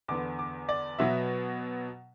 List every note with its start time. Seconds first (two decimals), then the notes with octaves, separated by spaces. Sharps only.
0.08 E2 D3 B3 D6
0.39 D6
0.69 D5
0.99 B2 F#3 B3 E5